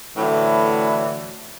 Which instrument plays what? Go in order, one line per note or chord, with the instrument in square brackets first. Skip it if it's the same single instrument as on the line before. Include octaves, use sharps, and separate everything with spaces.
[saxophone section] A2 D3 E3 F#3